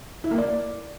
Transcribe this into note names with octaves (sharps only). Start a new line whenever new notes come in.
E4
A#3
D5